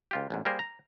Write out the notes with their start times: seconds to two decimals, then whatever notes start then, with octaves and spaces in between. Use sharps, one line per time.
0.11 C#2 F4 G4
0.30 A1 E2 G#2
0.45 G3 A#3 G#4 A#4 C5
0.59 A#5